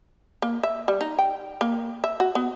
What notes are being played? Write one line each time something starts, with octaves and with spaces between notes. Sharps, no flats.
A#3
E5
G3
D#4
G5
A#3
E5
F#4
B3